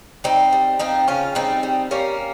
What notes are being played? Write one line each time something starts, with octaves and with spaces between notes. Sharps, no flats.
G3 C4 D#4
G3
F3 C4 D#4
C#3 C#4 F4
G3 C4 D#4
G3
G3 A#3 C#4